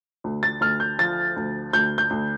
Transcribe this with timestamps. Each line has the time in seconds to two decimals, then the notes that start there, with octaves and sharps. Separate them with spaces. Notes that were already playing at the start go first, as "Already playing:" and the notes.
0.24 D2
0.43 A6
0.61 D2 F6
0.80 G6
0.99 F3 A6
1.36 D2
1.73 D2 G6
1.98 G6
2.10 D2